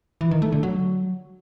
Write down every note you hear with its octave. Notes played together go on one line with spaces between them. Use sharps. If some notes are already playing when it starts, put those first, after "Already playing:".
E3
D#3
A3
D3
F#3